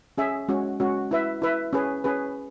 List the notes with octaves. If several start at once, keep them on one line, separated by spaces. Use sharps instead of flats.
C#4 G#4 E5
G#3 C#4 F#4
G#3 C#4 F#4
E4 B4 E5
E4 B4 E5
C#4 G#4 B4
C#4 G#4 B4